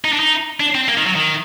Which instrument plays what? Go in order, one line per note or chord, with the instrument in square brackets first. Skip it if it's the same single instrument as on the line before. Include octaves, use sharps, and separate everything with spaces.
[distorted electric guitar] D#4
D4
D#4
D4
C4
A#3
D#3
F#3
D#3